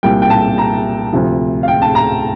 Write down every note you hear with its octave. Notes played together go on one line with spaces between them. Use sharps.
C2 A#2 G3 G5
G5
A5
A#5
D2 C3 F3
F5
G5
A5
A#5